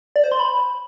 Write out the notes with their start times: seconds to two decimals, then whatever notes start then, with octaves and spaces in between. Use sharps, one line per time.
0.16 D5
0.24 C5
0.32 C6
0.40 B5